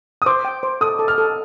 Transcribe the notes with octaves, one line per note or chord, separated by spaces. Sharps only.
D#6
C5 D6
G5
C5
A4 D#6
A4
F6
A4